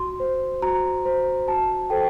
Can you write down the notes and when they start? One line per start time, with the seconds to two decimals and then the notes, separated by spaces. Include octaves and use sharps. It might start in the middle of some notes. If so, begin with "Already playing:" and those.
Already playing: F#4 C6
0.20 C5
0.62 F#4 A#5
1.05 C5
1.48 F#4 A5
1.90 A4 C5 G5